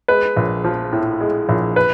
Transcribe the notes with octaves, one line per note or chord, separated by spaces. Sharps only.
G#3 B4
A#1
F3
A2
G#3
A#1
B4